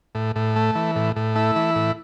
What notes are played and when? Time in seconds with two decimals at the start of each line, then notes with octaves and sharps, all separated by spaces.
0.15 A2
0.36 A2
0.56 A3
0.75 E3
0.96 A2
1.16 A2
1.35 A3 E4
1.56 E3
1.76 A2